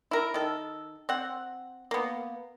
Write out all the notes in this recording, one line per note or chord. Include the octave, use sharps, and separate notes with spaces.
E4 A#4
D#3 A4
C4 F#5
A#3 B3